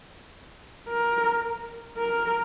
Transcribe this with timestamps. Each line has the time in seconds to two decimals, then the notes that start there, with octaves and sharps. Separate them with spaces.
0.89 A#4
1.97 A#4